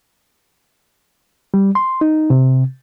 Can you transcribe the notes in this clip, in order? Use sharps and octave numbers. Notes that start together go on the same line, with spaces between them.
G3
C6
D#4
C3